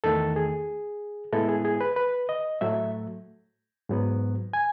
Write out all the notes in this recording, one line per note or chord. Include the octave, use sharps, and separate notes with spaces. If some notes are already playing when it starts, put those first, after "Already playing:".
E2 D#3 A3 A4
G#4
A2 G#3 B3 E4 A4
G#4
G#4
B4
B4
D#5
A2 F#3 A3 E5
G#2 F#3 B3
G#5